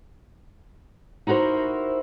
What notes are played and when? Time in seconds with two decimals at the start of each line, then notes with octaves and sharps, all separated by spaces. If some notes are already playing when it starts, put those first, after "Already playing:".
1.27 D#4 E4 F#4 A#4 C5